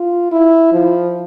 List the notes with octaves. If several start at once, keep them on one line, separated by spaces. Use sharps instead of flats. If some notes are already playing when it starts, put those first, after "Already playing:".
Already playing: F4
E4
F3